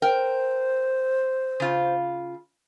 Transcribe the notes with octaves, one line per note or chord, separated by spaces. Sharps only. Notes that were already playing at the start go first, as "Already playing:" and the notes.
A#4 C5 G5
C#3 F4